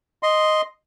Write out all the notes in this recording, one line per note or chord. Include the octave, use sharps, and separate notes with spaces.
D#5 C6